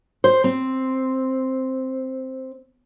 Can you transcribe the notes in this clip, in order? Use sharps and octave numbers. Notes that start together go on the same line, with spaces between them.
C5
C4